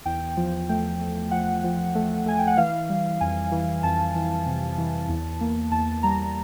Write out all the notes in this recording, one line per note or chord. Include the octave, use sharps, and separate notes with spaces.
E2 G5
F3
A3 G5
A3
F3 F#5
F3
A3
A3 G#5
G5
F#5
E3 F5
G3
F2 G#5
E3
F2 A5
E3
C3
E3
E2
A#3
E2 A5
G3 A#5